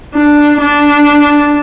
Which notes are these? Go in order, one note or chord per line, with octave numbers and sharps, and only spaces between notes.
D4
D4